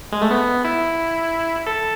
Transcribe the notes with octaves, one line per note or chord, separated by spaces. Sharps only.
G#3
A3
B3
E4
A4